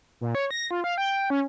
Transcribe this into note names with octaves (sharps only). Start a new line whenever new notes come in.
A#2
C#5
A#6
F4
F5
G5
C#4